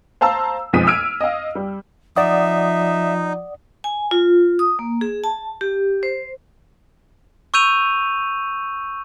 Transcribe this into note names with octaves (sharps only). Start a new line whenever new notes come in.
C5 F5 A5 A#5 E6
B1 F2 F3 G#3 B6 D#7
E6 F6 G#6 D7 D#7
D#5 F5
G3
F3 D#4 D5 E5 F#5 D#6
G#5
F4
D#6
A#3
G#4
A5
G4
C5
C#6 E6 G6 D#7 F7